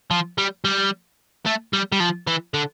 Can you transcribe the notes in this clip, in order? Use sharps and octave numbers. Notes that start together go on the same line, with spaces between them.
F3
G3
G3
A3
G3
G3
F3
E3
D3